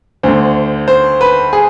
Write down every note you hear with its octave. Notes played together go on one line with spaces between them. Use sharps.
D2 D3 C5
C5
B4
G#4